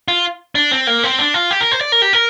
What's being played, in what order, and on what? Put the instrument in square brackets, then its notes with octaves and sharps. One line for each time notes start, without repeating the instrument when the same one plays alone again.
[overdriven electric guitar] F4
D4
C4
A#3
C4
D4
F4
G4
A#4
C5
D5
A#4
G4
A#4